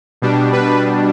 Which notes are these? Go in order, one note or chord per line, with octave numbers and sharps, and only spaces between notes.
B2 G3 D4
B4